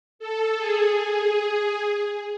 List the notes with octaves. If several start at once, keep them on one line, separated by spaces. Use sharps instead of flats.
A4
G#4
G#4